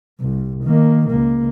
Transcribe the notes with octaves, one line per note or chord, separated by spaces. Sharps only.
C2
D#3 A#3
C#2 A#3